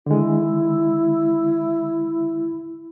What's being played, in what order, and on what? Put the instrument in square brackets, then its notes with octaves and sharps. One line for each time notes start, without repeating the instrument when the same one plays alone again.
[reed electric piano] D3 D#3 G#3 [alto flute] E4